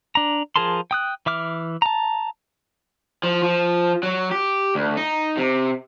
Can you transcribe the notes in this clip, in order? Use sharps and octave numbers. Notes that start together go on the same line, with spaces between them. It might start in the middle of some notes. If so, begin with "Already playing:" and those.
D4 A#5
F3 G#4 A#4 A5 C6
G5 D#6 F#6
E3 E5 D6 F6
A5 A#5
F3
F3
F#3
G4
D2
D#4
C3